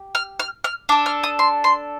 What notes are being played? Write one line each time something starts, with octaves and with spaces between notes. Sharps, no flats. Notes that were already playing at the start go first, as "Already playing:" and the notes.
Already playing: G4
F6
F6
F6
D4 A4 D6
F6
D#6
C6
C6